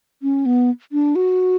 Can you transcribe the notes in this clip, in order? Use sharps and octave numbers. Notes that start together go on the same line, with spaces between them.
C#4
B3
D4
F#4